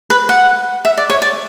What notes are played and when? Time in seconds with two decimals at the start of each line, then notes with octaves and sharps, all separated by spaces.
0.10 B4
0.29 F#5
0.85 E5
0.97 D5
1.10 C#5
1.22 D5